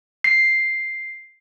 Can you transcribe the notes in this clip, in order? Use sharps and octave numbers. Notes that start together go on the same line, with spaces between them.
C7